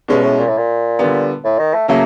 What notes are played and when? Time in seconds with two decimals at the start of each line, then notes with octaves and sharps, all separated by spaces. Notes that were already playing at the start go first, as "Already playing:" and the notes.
0.08 G2 B2 G#3 C#4
0.24 A2
0.39 A#2
0.48 A2
0.58 A#2
0.99 D3 G3 B3
1.44 A2
1.58 D#3
1.74 A3
1.88 C#3 F#3 A3 A#3 C#4